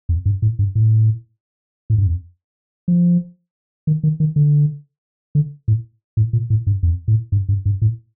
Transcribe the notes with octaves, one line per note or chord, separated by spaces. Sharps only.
F2
G2
A2
G2
A2
A2
G2
F2
F3
D#3
D#3
D#3
D3
D3
A2
A2
A#2
A2
G2
F2
A2
G2
G2
G2
A2